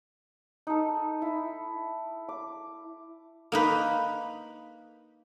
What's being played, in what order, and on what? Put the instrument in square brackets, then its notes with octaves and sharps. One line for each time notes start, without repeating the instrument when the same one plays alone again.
[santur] D#4 A4
E4
D6
[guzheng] A#3 D#4 B4